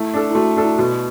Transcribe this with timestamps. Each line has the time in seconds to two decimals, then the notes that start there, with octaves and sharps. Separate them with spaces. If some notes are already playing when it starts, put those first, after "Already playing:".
Already playing: A3 E4
0.14 D4 A4
0.31 E4
0.35 A3 F#4
0.57 D4 A4
0.64 E4
0.78 B2 F#4